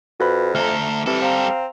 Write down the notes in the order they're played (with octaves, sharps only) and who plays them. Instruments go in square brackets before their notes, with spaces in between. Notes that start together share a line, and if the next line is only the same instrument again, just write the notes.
[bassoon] F2 [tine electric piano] F#4 B4 B5
[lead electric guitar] D2 A4 [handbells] E5 A#5 [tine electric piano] F6
[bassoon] E3 [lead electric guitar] G3 A4 [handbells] C4 G4
[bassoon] C4 [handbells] F5 A#5